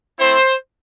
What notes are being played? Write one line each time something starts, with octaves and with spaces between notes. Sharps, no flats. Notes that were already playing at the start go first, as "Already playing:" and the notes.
A3 C4 E4 C5